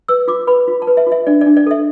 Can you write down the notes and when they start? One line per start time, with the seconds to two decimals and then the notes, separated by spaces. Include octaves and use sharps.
0.08 B4 E6
0.28 F4 D6
0.47 B4 B5
0.68 F4
0.82 A5
0.87 B4
0.97 E5
1.06 F4
1.12 E5
1.27 D4 D5
1.41 D5
1.46 D4
1.57 D5
1.66 A4 E5